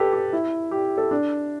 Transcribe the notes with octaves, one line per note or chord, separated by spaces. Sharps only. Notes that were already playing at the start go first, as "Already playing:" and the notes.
Already playing: G4 A4 B4
G4
E4
G4
A4
D4